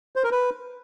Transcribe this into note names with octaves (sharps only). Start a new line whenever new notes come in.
C5
A#4
B4